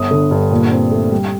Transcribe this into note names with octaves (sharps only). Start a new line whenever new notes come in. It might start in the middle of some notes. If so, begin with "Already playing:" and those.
Already playing: G1 D#6
D3
G2
A#2
C4
A3
G3